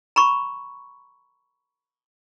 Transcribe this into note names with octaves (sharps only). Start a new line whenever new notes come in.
A#5 B5 C#6